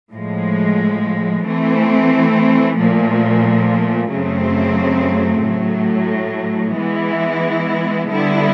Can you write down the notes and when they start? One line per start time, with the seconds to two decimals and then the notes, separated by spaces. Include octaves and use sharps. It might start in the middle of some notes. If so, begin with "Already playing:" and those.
0.11 A2 F3 G#3
1.45 E3 A3 C4
2.78 A#2 F3 A3
4.11 F#2 C#3 F#3 A3 C4
5.44 A2 F#3 A3
6.78 E3 G#3 B3 E4
8.11 D3 G3 B3 E4